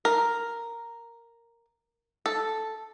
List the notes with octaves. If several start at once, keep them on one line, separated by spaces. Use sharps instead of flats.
A#4
A4